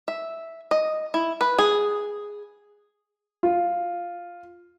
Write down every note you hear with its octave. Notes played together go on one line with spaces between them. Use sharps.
E5
D#5
E4
B4
G#4
F4